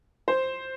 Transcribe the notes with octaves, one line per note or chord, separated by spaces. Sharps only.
C5